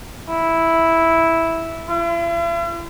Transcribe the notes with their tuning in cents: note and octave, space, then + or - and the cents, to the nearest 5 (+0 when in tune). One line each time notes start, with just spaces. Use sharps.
E4 -5
E4 +45